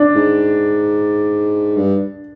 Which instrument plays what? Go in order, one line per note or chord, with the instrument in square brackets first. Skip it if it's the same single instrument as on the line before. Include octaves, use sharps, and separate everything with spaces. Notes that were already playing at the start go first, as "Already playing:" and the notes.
Already playing: [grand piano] D4
[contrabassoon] G#2
G2